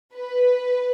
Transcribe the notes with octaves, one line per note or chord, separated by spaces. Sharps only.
B4